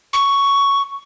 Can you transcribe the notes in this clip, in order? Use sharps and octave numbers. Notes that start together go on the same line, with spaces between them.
C#6